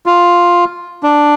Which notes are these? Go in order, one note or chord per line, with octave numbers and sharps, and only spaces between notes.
F4
D4